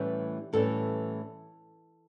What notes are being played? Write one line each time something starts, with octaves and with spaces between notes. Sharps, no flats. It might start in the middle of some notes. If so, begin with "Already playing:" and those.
Already playing: A2 E3 G3 C#4 G4
A2 E3 G3 C#4 A4